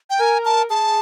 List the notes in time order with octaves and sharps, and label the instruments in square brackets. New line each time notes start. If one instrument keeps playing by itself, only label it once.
[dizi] G5
[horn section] A#4 [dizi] G#5
[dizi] A5
[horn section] G#4 [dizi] A5